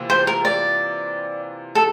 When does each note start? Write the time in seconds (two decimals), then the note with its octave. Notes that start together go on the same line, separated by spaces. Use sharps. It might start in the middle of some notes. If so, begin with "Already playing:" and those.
Already playing: C3 E3 A#3 F4
0.10 C5
0.27 A#4
0.45 D5
1.75 A4